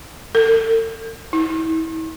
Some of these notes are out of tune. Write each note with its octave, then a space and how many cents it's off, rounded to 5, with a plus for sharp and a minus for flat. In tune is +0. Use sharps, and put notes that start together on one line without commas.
A4 +40
E4 -40